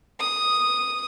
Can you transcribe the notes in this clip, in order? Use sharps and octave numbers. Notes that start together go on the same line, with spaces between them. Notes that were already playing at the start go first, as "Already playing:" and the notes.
D#6